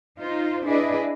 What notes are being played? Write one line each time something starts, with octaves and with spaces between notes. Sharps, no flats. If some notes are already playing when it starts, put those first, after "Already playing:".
D#4 F4 C5
D4 E4 G#4 B4 D5 D#5